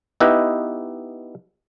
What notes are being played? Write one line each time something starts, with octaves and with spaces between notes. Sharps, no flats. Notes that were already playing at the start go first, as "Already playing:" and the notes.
B3 D#4 E4 G4 B4 D#5